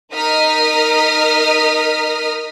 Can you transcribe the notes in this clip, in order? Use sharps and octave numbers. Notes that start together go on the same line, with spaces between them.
D#4 A#4 D#5 D#6 F6 B6